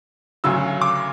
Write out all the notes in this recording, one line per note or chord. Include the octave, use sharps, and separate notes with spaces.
D2 C#3 F#3 E6
D6